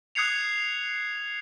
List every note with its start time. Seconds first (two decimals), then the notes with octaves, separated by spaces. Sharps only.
0.15 D#6 F#6 G#6 C7 C#7 F7